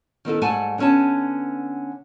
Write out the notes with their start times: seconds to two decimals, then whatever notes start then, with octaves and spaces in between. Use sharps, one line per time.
0.25 D#3 B3 E4 A4
0.41 G#2 G3 A3 F#5 G#5 A5
0.78 D3 B3 C#4 C#5 A5